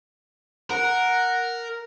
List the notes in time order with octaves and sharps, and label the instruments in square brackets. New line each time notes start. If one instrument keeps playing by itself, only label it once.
[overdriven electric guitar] A#4 [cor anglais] F#5